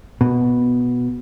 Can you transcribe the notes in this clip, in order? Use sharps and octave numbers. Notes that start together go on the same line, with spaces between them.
B2